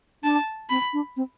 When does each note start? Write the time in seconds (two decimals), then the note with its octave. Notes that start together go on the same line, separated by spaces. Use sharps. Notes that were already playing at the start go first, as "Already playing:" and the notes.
0.23 D4 A5
0.70 C4 B5
0.93 D4
1.17 C4